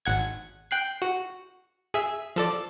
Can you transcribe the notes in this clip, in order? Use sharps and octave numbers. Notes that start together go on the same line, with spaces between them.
G#1 F#5 G#6
G5 F#6 C7
F#4
G#4 E5
F3 A4 D5